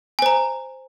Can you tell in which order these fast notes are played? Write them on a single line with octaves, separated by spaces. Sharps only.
G#5 C5 A#5